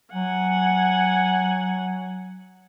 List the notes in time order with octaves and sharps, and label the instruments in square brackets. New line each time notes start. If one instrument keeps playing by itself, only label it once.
[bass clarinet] F#3 [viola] F#5 G#5